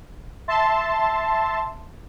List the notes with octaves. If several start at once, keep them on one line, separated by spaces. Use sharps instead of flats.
E5 A5 C6